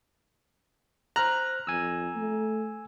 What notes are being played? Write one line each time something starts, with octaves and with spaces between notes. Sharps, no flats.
C5 A#5 F6 F#6
F2 G#5 E6
A3